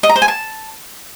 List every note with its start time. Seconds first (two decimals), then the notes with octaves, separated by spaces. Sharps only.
0.03 D#5
0.09 A#5
0.16 C5
0.22 G#5
0.28 A5